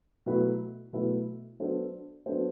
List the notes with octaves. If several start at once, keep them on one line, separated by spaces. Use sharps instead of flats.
B2 F#3 A3 E4 B4
B2 F#3 A3 E4 B4
F#3 B3 D4 A4 C5
F#3 B3 D4 A4 C5